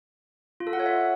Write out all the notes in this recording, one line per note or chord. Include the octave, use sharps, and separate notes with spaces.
F4
A4
F#5
C#5
E5